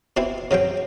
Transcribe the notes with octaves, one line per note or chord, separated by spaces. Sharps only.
B2 C4 E4
C#3 F#3 C4 G5